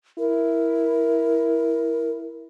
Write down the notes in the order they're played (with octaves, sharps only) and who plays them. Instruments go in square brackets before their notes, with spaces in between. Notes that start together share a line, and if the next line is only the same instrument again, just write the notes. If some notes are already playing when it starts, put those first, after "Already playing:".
[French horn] E4 [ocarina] A#4